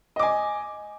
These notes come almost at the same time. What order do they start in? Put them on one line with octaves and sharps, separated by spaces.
D#5 D6 G#5